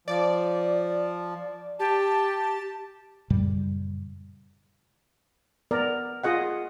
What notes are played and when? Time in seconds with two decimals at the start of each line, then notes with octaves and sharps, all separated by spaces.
0.08 F3 D5
1.80 G4 A5
3.30 F#2 A#2 C#3 G3
5.71 B3 A#4 D5
6.24 F4 G#4 D#5 F#5